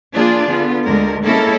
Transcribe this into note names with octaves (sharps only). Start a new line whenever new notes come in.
F3 A#3 D4 F4 G#4 D5
D3 B3 F4
D2 D3 G#3 A#4
G#3 A#3 C#4 E4 A4 A#4